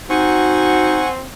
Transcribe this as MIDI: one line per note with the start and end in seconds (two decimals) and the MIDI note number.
0.10 1.23 60
0.10 1.03 63
0.10 1.03 66
0.10 1.08 78
0.10 1.08 80
0.10 1.08 85